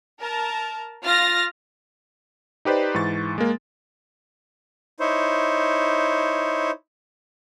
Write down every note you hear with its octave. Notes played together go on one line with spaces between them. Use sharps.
A#4 A5
F4 F6 A6 A#6
D#4 G4 B4 C5 D5
G#2 E3 C#6 A6
G#3 A#3
D#4 E4 C5 C#5